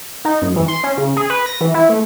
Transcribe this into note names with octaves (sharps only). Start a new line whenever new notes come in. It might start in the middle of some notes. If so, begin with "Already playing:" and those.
D#4
F#2
E3
C6
C#4
C#3
G#4
B4
A#6
E3
E4
A3